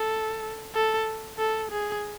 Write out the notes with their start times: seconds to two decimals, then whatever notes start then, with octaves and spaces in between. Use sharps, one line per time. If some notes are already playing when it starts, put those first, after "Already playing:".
Already playing: A4
0.75 A4
1.39 A4
1.71 G#4